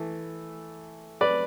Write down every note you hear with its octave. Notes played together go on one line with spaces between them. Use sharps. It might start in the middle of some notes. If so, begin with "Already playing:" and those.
Already playing: E3 A3
B4 D5